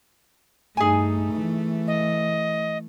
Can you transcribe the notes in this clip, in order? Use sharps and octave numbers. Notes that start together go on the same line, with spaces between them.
G2 A3 D#4 G#4 G#5
E3
D#5